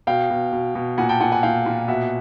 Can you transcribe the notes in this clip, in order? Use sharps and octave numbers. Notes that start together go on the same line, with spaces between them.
B2 F5 G5
B2
B2
B2
A#2 F#5 G#5
G5 A5
A#2 F#5 G#5
F#5 G#5
A#2 F5 G5
A#2
B2 E5 F#5